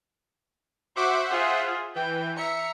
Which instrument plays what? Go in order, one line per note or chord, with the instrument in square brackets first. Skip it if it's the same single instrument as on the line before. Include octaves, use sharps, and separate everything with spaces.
[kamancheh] F#4 D6 [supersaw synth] C5 E5 F#5
[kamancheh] F4 G#4
[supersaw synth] E3 [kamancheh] G5
[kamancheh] E5 A#5 [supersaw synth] C#7